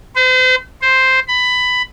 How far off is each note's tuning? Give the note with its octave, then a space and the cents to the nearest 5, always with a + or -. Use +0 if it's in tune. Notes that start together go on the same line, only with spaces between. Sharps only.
C5 -40
C5 +0
B5 +15